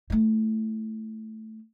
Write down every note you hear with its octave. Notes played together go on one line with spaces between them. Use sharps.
A3 E4